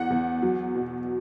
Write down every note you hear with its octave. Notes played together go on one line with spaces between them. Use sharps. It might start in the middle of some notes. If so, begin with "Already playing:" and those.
Already playing: E2 F#5
E2
F#3
B2